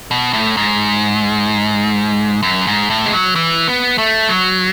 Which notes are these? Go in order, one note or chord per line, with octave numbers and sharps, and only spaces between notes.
B2
A2
G#2
F#2
G#2
A2
G#3
F#3
E3
B3
A3
F#3